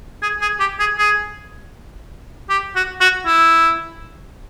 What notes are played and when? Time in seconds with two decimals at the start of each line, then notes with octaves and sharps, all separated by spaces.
0.22 G#4
0.41 G#4
0.60 G4
0.79 G#4
0.98 G#4
2.50 G4
2.75 F#4
3.01 F#4
3.26 E4